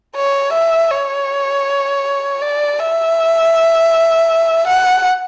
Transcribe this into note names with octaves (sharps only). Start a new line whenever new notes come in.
C#5
E5
C#5
D5
E5
F#5